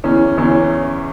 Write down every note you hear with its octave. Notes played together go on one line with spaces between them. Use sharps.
E2 E3 C#4
E2 E3 C#4